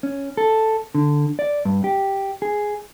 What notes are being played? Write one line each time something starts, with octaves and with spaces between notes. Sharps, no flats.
C#4
A4
D3
D5
G2
G4
G#4